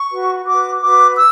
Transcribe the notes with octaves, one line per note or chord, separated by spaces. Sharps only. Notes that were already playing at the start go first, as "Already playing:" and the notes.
Already playing: C#6
F#4 B4
F#4 B4 D6
F#4 B4 D6
E6